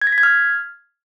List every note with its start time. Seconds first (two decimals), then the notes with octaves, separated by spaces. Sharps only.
0.02 G#6
0.07 A#6
0.12 B6
0.18 G#6
0.23 F6